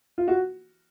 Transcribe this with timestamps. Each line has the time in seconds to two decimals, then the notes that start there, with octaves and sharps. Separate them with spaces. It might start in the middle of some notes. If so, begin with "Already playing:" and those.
0.18 F4
0.28 F#4